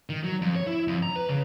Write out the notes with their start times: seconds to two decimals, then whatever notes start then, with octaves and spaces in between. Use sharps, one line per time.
0.09 D#3
0.24 F#3
0.42 F2
0.56 C#5
0.67 E4
0.88 F2
1.03 A#5
1.16 B4
1.29 C#3